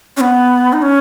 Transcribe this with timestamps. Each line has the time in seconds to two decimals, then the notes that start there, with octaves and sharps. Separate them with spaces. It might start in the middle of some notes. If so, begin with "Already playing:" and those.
0.17 C#4
0.21 B3
0.73 D#4
0.82 C#4